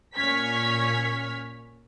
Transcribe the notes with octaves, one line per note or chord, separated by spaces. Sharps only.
A#2 C#4 C#6 F6 G#6 B6